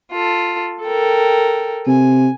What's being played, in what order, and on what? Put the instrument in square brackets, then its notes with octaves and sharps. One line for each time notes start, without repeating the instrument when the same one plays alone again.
[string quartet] F4 A4
A4 A#4 G5
[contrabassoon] C3 [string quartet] G#5